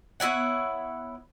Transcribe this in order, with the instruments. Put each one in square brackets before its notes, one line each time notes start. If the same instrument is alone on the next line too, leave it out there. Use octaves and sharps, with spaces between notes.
[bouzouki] B3 E4 C#5 F#5